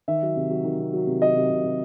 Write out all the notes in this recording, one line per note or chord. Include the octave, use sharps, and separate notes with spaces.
D#3 E5
F#3
C3
F#3
D#3
C3
F#3
C3
F#3 D#5
C3
C3
C3